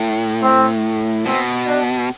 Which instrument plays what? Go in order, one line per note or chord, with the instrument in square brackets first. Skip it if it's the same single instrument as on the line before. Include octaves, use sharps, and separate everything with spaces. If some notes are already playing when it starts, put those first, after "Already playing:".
Already playing: [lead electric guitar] A2
[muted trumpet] C4
[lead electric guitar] B2 [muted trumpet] C4
[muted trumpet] D4